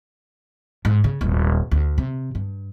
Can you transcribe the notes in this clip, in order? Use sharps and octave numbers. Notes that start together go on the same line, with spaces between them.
G#2
C#3
D#1 G#1
D2
C3
G2